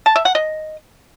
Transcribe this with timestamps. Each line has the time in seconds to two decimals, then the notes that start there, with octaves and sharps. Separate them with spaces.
0.06 A5
0.16 E5
0.25 F#5
0.35 D#5